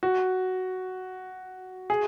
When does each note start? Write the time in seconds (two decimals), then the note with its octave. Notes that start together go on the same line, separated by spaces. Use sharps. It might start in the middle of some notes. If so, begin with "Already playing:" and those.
0.03 F#4
1.90 G#4